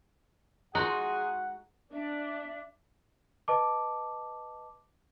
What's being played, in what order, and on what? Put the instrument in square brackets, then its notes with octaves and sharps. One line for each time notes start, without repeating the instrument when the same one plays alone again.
[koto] G#3 D#4 F#4 [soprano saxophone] G#4 [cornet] F#5 [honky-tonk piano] A#5 C6
[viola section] D4 [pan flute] E5
[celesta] B4 D#5 A5 D6